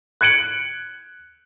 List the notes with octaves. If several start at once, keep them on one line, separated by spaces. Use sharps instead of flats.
F#6 G#6 C#7 D7 F#7